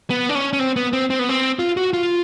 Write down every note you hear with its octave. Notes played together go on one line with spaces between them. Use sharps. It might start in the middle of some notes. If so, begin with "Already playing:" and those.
B3
D4
C#4
C#4
C4
B3
C4
C4
B3
C4
F4
F#4
F4